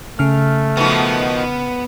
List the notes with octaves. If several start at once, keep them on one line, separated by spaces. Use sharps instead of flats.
C#3 A3 F6
B2 D#3 F3 B3